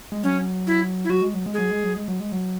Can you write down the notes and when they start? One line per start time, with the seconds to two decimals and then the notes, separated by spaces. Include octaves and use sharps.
0.12 G#3
0.23 F#3 C#4
0.67 E4
1.04 E4
1.10 F#3 F#4
1.22 G#3
1.34 F#3
1.46 G#3
1.54 F#3 G#4
1.71 G#3
1.84 F#3
1.96 G#3
2.08 F#3
2.20 G#3
2.32 F#3